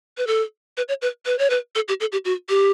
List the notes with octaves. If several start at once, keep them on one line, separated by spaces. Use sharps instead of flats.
B4
A4
B4
C#5
B4
B4
C#5
B4
A4
G4
A4
G4
F#4
G4